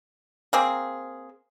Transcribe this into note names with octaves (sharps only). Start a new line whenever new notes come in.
A#3 C4 G#4